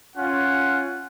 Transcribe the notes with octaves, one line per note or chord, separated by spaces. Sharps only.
C#4 F4 F#5